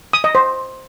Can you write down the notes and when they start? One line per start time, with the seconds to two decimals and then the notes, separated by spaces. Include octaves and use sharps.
0.13 D#6
0.24 D#5
0.35 C5